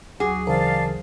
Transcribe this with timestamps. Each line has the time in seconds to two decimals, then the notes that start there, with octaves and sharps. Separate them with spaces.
0.20 D2 F#3 F#4 G#4 D6
0.47 C#3 E3 A#4 C5 D5 F5 A5